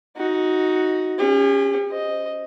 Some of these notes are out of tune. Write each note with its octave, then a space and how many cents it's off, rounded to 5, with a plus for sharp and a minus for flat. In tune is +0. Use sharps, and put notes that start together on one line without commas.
D#4 +15 F#4 +0
C#4 +0 G4 +45
C5 +0 D#5 +0